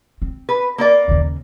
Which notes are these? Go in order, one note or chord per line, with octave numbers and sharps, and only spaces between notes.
C4
B4
A#3 A#4 D5
D#2 C#3